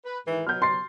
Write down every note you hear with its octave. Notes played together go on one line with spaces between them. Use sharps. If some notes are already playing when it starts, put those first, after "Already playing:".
B4
G#2 D#3 E3
B2 F#3 F6 G6
C6 A6 C7